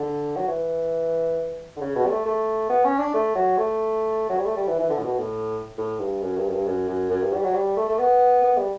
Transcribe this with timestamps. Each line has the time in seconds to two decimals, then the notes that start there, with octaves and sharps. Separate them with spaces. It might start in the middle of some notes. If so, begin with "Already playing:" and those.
Already playing: D3
0.36 F#3
0.48 E3
1.76 D3
1.81 C#3
1.96 B2
2.05 G3
2.10 A3
2.25 A3
2.69 B3
2.84 C#4
2.98 D4
3.14 A3
3.35 F#3
3.57 A3
4.29 F#3
4.38 G3
4.45 A3
4.57 G3
4.68 E3
4.79 E3
4.90 D3
4.98 A2
5.05 B2
5.19 A2
5.78 A2
6.00 G2
6.22 F#2
6.37 G2
6.48 F#2
6.52 G2
6.66 F#2
6.88 F#2
7.10 F#2
7.22 G2
7.34 G3
7.44 F#3
7.54 G3
7.77 A3
7.89 A3
7.99 B3
8.43 B3
8.57 G3